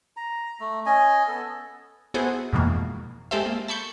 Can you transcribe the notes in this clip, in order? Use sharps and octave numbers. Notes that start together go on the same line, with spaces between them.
A#5
A3
C#4 D#5 G#5
B3 A4
B3 E4 F#4 G#4 A4 C5
F2 G#2 B2 E3 A#3
G#3 G4 A4 C5 E5
A#3
A5 B5 C#6 G6